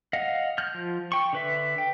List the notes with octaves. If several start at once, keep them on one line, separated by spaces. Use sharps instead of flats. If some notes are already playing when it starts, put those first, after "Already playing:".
D#5 F5 F#5
F6 G6
F3
G5 C#6
D3 B4 E5
G5